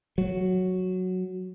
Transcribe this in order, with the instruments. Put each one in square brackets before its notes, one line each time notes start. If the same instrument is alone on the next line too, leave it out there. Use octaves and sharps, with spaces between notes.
[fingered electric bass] F#3